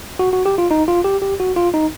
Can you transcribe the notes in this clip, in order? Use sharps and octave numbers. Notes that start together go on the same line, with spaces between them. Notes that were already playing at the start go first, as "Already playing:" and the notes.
F#4
F#4
G4
F4
D#4
F4
G4
G4
F#4
F4
D#4